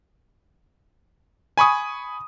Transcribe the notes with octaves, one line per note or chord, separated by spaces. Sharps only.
G#5 B5 C#6 D#6